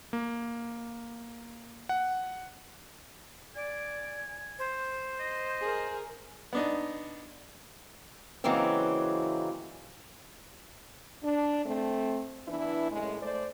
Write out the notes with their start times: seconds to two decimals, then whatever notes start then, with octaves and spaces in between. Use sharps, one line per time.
0.13 A#3
1.89 F#5
3.56 D5 G#5
4.59 C5
5.20 D#5
5.61 G#4 A#4
6.53 B3 D4 D#4
8.44 C#3 E3 F#3 G#3 A#3 C4
11.23 D4
11.65 A3 C4
12.48 E3 B3 D4 E4
12.92 F#2 A2 G#3
13.22 A3 C5 D5